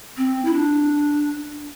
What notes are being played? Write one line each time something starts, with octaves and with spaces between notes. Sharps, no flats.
C4
E4
D4